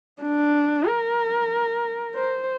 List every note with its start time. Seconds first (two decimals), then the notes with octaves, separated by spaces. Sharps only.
0.22 D4
0.87 A#4
2.16 C5